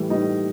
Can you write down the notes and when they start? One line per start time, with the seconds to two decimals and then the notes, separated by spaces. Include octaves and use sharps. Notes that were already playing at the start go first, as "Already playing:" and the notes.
Already playing: A2 E3 G3
0.10 A2 E3 G3 D#4